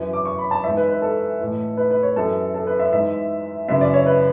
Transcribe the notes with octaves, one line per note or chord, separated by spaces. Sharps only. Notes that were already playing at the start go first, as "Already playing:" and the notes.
Already playing: F#2 E3
D6
C#6
B5
A5
G#2 E3 E5
B4
B4
A4
A2 E3
B4
B4
C#5
F#2 E3 A4
A4
B4
E5
G#2 E3 E5
F#2 C#3 E3 E5
D5
C#5
B4